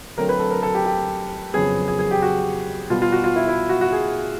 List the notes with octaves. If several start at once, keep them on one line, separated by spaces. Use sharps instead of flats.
D3 F#3 A3 C4 A#4
B4
A4
A#4
A4
G4
G4
F2 C#3 F#3 B3 G#4
G#4
G#4
G4
F#4
B2 G3 B3 F4
F4
F#4
F4
E4
E4
F#4
F#4
G#4